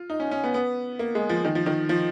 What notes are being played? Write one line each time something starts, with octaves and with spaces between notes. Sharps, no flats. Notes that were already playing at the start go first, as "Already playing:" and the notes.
Already playing: F4
D#4
C#4
C#4
B3
B3
A#3
G#3
F3
D#3
F3
D#3
F3